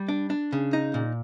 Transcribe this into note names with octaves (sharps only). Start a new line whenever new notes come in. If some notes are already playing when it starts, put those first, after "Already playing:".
Already playing: G3
D4
D4
C#3
D#4
A#2